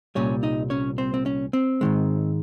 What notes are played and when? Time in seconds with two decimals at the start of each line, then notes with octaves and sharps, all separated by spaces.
0.15 C2 A#2 G3 C#4 C#5
0.43 D#4 D#5
0.70 C#4 C#5
0.98 C4 C5
1.14 C4
1.26 C#4
1.53 C4
1.81 G#2 D#3 G#3